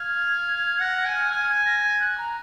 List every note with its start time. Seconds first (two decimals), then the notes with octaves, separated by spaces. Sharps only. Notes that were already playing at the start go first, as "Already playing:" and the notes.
Already playing: F5 G#6
0.80 F#5 A#6
0.97 G#6
1.06 G#5
1.14 F6
1.31 G#5 F6
1.49 G#6
1.65 A#6
1.79 A#6
1.83 G#6
2.00 F#6
2.17 A#5